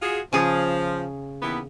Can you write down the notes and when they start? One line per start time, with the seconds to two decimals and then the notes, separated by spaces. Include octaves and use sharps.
0.02 F4 F#4 G#4
0.33 C#3 F3 G#4
1.41 D#2 E3 B3